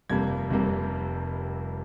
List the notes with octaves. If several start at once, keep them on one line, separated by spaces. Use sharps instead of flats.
F1 F2 C3 G3 A#3 G#6
F1 F2 C3 G3 A#3